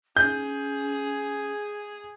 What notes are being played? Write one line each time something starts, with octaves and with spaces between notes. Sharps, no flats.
C#4 G#4 G6